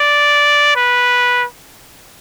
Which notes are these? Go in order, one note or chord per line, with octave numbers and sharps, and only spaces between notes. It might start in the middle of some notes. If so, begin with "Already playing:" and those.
Already playing: D5
B4